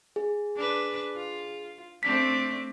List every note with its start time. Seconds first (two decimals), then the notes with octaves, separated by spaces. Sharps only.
0.16 G#4
0.55 D4 B4
1.15 F4
2.03 A3 C4 D4 B6